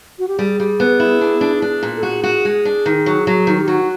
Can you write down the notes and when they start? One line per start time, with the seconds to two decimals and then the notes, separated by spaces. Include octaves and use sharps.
0.19 F#4
0.28 G4
0.38 G3 G#4
0.60 G3
0.80 B3
1.00 E4
1.21 D4
1.41 D4
1.62 D4
1.83 A#2
1.97 A4
2.03 F#4 G#4
2.24 F#4
2.45 G#3
2.65 D4
2.86 D#3
3.06 F#3
3.27 F#3
3.47 D#3
3.60 G4
3.68 F#3 F#4